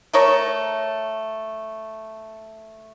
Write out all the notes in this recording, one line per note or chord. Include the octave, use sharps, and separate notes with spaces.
A3 A#4 C#5